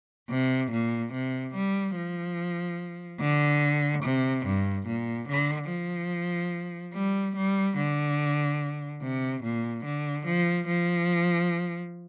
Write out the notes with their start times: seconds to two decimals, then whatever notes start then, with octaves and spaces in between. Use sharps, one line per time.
0.30 C3
0.71 A#2
1.13 C3
1.54 G3
1.96 F3
3.20 D3
4.03 C3
4.45 G2
4.86 A#2
5.28 D3
5.70 F3
6.94 G3
7.36 G3
7.77 D3
9.02 C3
9.43 A#2
9.85 D3
10.26 F3
10.67 F3